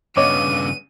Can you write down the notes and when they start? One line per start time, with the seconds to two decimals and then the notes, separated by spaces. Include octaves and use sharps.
0.17 G2 C#3 B3 C#5 D#5 D6 D#7